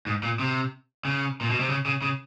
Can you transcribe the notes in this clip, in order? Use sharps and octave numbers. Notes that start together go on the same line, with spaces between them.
G#2
A#2
C3
C#3
A#2
B2
C3
C#3
C#3
C#3